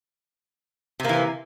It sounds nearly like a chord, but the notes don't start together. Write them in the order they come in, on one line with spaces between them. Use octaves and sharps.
C3 A#3 E3